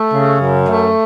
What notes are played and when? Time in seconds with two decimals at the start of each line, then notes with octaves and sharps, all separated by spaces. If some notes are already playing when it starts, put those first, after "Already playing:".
Already playing: A3
0.12 C#3
0.39 F#2
0.67 A3